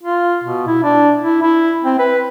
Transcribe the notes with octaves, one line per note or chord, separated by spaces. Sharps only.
F4
B2
E4
D4
E4
E4
C4
B4